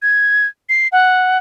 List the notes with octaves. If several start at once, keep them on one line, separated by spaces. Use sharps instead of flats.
G#6
C7
F#5